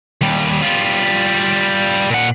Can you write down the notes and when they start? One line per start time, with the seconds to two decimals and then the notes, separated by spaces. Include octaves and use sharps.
0.21 D#2 G3
0.62 G3 F4
2.10 A#2 F#5